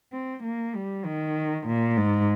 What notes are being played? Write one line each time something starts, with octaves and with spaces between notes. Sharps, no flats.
C4
A#3
G3
D#3
A#2
G#2